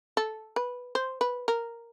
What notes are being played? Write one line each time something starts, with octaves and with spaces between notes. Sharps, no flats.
A4
B4
C5
B4
A#4